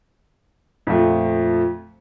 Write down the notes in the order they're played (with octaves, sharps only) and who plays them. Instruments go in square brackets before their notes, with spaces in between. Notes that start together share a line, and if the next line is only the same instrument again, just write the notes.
[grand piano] F2 A#2 F3 A3